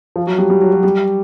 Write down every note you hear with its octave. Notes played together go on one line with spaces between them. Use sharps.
F3
F#3
G3
G3
F#3
F#3
G3